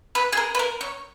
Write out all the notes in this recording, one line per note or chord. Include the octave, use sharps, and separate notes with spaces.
B4
G#4
A#4
B4
A#4
C#5